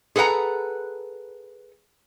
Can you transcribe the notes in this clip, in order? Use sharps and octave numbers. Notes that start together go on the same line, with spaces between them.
G#4 A4 B4 F#5 A#5